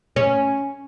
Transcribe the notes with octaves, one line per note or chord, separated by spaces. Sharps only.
C#4